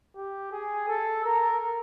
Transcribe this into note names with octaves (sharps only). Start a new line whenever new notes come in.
G4
G#4
A4
A#4